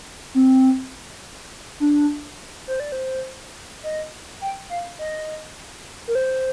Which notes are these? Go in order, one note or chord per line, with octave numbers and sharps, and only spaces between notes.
C4
D4
C5
D5
C5
D#5
G5
F5
D#5
A#4
C5